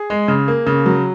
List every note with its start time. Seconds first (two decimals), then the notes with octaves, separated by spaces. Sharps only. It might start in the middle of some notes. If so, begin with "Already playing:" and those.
Already playing: G#4
0.10 G#3
0.28 C#3
0.48 A#3
0.67 C#3
0.86 F#3